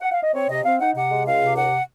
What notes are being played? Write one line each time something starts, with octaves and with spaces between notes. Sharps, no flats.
F#5
F5
D#5
C4 C#5
C3 D#5
C4 F5
D#4 F#5
C3 F#5
G#3
C#2 F5
C3
D#2 F#5